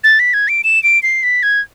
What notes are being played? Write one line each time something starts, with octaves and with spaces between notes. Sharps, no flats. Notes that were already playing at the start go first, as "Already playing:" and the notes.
A6
B6
G#6
D7
E7
D7
C7
B6
G#6